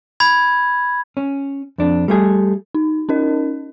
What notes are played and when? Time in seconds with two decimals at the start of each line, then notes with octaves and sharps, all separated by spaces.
0.20 B5 G#6
1.17 C#4
1.78 F2 D4
2.08 G3 A3 G#4
2.75 D#4
3.09 C#4 D#4 A#4 D#5